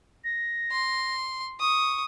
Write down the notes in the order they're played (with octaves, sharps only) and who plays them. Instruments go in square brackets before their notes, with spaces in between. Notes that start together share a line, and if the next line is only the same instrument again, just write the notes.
[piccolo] A#6
[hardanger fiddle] C6
[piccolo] C#6 [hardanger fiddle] D#6